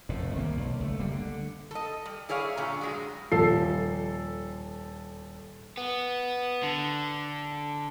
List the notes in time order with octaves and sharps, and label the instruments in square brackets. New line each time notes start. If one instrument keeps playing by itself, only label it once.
[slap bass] F1 F2 A2
C2 D#3 G#3 A#3
B1
C#2 G#3 A3
F#1 G3 A#3
D3
[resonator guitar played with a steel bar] A4 D#5
G3
E4 G#4 C#5 D5 F5
G2 A#2 D3 C#4
G2 F#3 G#3
[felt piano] D#1 F3 A4 C7
[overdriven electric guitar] B3
D3